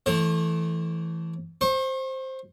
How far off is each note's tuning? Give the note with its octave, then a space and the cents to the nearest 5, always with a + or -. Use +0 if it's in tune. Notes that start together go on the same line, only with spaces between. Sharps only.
E3 +0 A3 +0 C5 +45
C5 +5 C#6 -45